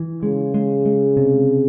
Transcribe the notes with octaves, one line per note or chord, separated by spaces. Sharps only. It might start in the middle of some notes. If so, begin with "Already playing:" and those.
Already playing: E3
C#3 G#3
G#3
G#3
C3